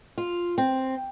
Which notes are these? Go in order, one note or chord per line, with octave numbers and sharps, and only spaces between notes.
F4
C4